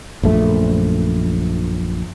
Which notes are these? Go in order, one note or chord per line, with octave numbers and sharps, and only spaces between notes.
A#1 F#2 A3